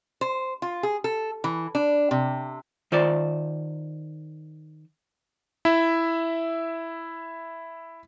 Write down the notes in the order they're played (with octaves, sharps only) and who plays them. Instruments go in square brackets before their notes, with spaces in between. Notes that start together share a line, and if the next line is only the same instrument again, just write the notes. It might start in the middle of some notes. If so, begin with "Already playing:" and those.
[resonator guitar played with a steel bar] C5
F4
G#4
A4
E3
D4
C3
[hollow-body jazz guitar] D#3 F4 C5 D5
[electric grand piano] E4 E5